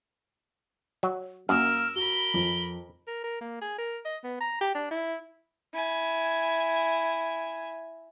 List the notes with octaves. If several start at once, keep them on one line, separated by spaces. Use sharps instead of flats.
F#3
F#2 A#3 A#4 E6 F6
F#4 A#4 B5 G7
F2
A#4
A#4
A#3
G#4
A#4
D#5
B3
A#5
G4
D4
E4
E4 G#5